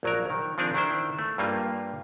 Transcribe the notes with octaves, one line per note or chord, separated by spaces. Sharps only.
A#1 F#3 A#4
D#3
F3 C4 D4 G#4 A#4
D#3 D4 E4 C5
A3
G2 G3 A#3 F4